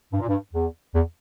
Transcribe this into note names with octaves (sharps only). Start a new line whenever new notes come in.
G2
A#2
G2
E2
E2